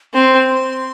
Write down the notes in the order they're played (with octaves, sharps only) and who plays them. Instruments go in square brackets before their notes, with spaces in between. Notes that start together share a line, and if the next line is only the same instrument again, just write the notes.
[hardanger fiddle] C4 [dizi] C6